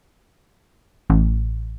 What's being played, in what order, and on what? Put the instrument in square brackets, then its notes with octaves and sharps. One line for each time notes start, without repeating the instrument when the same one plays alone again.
[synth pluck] A1